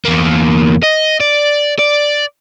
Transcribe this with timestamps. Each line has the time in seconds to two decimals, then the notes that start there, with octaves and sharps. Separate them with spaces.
0.05 E2 A#3
0.84 D#5
1.21 D5
1.79 D5